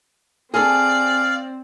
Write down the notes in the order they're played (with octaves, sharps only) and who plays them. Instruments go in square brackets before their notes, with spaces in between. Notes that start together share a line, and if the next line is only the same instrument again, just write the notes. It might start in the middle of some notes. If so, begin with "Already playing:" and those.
[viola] C4 [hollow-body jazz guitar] G#4 A4 [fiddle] D5 [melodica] F5